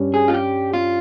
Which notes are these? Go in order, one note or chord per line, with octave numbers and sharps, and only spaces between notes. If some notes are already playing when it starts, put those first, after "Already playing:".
Already playing: G2 G3 C#4
G#4
F4
G4
F4